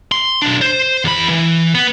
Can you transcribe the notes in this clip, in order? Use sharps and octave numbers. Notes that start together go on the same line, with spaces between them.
C6
B1 D4
C5
E2 B5
E3
B3